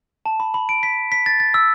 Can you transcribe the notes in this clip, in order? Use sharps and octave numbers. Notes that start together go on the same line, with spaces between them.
A5
B5
B5
D7
B6
B6
A6
A6
E6